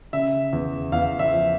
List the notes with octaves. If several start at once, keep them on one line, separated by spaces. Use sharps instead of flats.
C#3 E5
E2
E2 F5
E5
F3